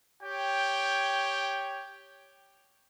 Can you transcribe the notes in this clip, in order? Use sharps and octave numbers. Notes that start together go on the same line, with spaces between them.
G4 C#5 G5